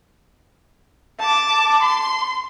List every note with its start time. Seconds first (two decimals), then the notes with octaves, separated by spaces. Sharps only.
1.19 A5 D6
1.82 C6